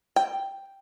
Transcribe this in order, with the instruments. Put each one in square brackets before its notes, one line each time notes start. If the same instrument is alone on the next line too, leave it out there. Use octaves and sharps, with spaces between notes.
[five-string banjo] G5